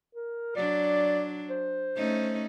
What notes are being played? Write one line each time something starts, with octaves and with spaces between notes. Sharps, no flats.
A#4
F#3 D4 D5
C5
A3 C#4 D#4